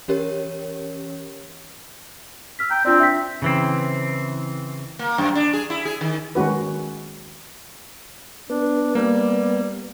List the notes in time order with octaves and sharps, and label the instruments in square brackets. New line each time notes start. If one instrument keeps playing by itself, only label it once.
[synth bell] E3 C#4 G4 A#4 C#5
[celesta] E6 F6 B6
[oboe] G5 [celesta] A#5
[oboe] C4 [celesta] D4 F4 D5
[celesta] E5 G5 B6
[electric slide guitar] C#3 E3 C4
[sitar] A#3
F#2
D4
G#4
E4
G#4
D#3
[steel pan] D#3 G#3 C#4 F#4 B4
[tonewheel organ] B3 [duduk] D4
[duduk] G3 [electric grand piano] A#3